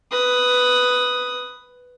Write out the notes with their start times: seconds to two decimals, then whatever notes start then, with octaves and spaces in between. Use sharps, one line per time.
0.11 B4 D#6